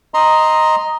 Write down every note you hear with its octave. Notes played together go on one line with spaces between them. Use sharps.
D#5 A#5 C6